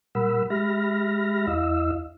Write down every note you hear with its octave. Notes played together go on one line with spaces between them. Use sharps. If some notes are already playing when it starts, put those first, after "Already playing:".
A#2 G3 A#4 F#5 B5 E6
G#3 G4 E5 B5 F6 A#6
E2 E4 D#5 F5 E6